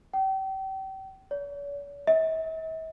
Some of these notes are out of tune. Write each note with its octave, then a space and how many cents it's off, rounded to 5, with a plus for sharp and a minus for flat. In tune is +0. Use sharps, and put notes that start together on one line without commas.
G5 -35
C#5 +45
E5 -45